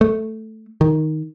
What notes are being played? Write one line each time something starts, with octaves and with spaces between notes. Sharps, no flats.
A3
D#3